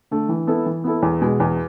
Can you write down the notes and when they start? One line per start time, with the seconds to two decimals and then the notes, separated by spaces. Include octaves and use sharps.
0.11 D3 A3
0.29 E3
0.47 B3 E4 A4
0.66 E3
0.84 B3 E4 A4
1.02 E2
1.22 B2 G#3
1.40 E2